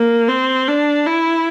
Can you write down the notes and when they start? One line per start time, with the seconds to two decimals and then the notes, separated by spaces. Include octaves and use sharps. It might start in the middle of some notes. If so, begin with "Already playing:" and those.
Already playing: A#3
0.29 C4
0.68 D4
1.06 E4